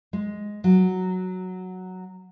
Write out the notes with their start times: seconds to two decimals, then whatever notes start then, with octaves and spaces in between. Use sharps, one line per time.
0.13 G#3
0.64 F#3